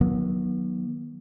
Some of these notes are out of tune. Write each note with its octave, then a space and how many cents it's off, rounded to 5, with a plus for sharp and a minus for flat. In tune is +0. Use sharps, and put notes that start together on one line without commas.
D#3 +0 F#3 -15 B3 -35